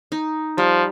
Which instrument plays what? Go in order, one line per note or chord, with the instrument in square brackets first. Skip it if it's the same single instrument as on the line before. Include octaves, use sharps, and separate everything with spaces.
[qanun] D#4
[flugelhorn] F3 [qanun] G3